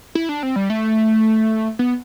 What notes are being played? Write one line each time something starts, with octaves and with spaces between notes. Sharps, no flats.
E4
D4
C4
G3
A3
B3